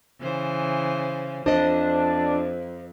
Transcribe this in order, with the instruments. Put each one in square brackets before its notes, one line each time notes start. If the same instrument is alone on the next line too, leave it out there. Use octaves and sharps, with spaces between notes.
[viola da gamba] C#3 E3 C5
[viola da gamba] F2 [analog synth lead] D4 [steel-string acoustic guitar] C5 D#5